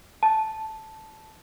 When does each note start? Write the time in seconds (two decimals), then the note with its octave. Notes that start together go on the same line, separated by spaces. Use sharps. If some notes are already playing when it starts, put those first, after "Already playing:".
0.23 A5